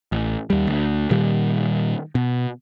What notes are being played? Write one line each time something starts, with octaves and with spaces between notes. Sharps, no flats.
A1
D#2 G3
D2
A#2 D#3 G3
B2